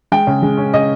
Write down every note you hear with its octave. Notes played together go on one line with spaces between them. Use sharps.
G#3 G5
C#3
G#3
C#4
C#3 D#5